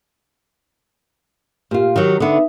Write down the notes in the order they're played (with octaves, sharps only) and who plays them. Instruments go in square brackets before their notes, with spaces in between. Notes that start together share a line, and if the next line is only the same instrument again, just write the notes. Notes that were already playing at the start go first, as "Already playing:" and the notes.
[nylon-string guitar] A#2 F4 [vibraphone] G4
[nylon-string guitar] D#3 F#3
[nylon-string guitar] D3 B3 [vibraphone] D#4 B4 E5